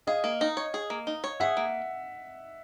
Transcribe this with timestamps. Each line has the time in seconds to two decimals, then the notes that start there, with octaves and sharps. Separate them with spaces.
0.07 G#4 D#5 F5
0.24 A#3
0.41 D#4
0.57 C#5
0.74 G#4
0.90 A#3
1.07 D#4
1.24 C#5
1.40 G#4 E5 F#5
1.57 A#3